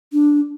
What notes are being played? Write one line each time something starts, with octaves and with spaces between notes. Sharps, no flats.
D4